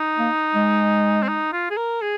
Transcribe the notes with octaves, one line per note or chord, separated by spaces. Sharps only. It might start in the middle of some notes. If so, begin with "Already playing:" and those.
Already playing: D#4
A#3
G#3
C4
D#4
F4
G#4
A#4
G#4